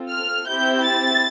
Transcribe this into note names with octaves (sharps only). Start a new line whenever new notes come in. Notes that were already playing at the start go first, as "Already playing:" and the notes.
Already playing: C4 F4 A4
F6
C4 E4 G4 G6
A6